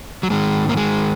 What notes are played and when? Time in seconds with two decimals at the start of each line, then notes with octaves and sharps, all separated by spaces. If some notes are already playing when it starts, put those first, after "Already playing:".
0.23 F#3
0.30 G#2 D#3 G#3
0.69 A#3
0.77 G#3